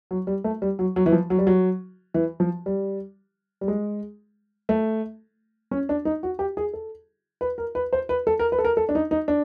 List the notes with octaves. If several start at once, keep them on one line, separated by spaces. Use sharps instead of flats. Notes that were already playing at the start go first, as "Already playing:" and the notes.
F#3
G3
A3
G3
F#3
F#3
E3
F3
F#3
G3
F#3
E3
F3
G3
G3
G#3
A3
C#4
D4
D#4
F#4
G4
G#4
A4
B4
A#4
B4
C5
B4
A4
A#4
B4
A4
A#4
A4
D4
D#4
D#4
D4